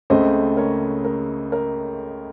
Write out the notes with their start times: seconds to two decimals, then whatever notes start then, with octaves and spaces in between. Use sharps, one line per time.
0.10 C#2 C#3 A3 C4 C5 D#5
0.57 A#4 C#5
1.05 A#4
1.52 A#4